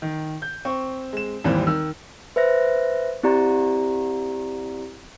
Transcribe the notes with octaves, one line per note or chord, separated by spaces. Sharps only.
D#3
G6
C4 C#6
G#3 E7
G#1 D#2 E3 G3 C4
D#3 E6
B4 C5 E5 F#6 A#6
C4 E4 G4 D5 A#5